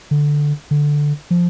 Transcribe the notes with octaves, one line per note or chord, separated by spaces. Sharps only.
D3
D3
F3